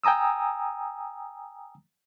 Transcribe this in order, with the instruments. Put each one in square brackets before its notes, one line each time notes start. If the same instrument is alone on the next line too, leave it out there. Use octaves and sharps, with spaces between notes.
[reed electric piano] G5 G#5 A#5 D#6 E6